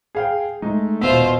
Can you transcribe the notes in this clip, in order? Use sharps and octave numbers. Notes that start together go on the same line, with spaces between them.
G#4 F5 G5
G#3 A3 D#4
D#1 B2 B3 F4 C5 E5